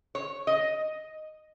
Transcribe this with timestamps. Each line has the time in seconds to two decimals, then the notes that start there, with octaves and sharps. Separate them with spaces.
0.15 C#5
0.47 D#5